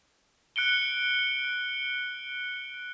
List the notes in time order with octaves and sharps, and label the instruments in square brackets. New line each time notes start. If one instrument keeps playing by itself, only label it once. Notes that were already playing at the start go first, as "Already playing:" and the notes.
[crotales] F#6 C#7 D7 G7